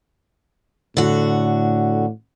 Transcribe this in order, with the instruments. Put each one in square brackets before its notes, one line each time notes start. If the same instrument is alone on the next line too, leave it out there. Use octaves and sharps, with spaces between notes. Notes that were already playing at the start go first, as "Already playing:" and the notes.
[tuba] A2 [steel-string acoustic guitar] D3 F#4